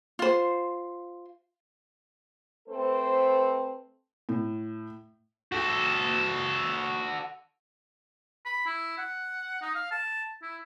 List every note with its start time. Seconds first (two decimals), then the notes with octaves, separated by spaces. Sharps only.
0.19 F4 C5
2.68 A3 C4 A4 B4 C5
4.29 A2
5.52 F#4 A4
8.46 B5
8.66 E4
8.98 F#5
9.61 D#4
9.75 F5
9.91 A5
10.42 E4